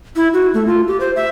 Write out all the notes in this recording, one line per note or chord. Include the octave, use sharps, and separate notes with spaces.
E4
F#4
A3
F4
G4
C5
E5